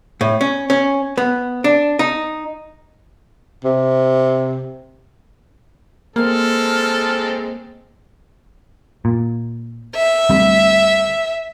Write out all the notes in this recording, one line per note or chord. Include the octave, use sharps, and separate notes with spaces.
A2
C#4
C#4
B3
D4
D#4
C3
G#3 A#3 C4 A4 F6
A#2
E5
D2 G3 C4